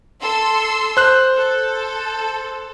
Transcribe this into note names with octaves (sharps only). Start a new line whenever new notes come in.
A4 C6 E6
C5 F#6
A4